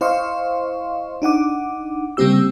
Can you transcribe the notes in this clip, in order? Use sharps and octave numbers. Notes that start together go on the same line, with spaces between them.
E4 C5 D#5 F5 C6 C#6
D4 D#4 F#5 D6
C#3 G3 A#3 C4 G4 E6